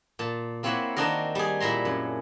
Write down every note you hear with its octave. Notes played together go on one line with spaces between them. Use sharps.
A#2 A5
A#3 C4 E4 C#5 E5 F#5
D#3 C4 D4 D#4 F#4 A#4
G3 G#4
A#2 E4 E5 A#5 C6
F#2